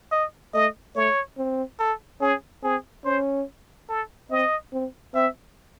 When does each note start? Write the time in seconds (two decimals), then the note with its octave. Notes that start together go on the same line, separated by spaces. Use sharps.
0.12 D#5
0.54 A3 D#5
0.95 A3 C#5
1.38 C4
1.80 A4
2.21 C#4 G#4
2.63 C4 G#4
3.05 C#4 C5
3.89 A4
4.30 C4 D#5
4.73 C4
5.14 C4 E5